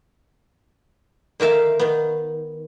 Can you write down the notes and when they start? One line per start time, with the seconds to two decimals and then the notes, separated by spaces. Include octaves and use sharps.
1.40 D3 D#3 A#4 E5 F5
1.79 D#3 B3